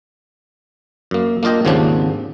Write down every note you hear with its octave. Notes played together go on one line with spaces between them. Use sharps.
F#2 A#3
A#3 D4 F4 D#5 G5
G#1 D#2 C#3 F3 C4 D4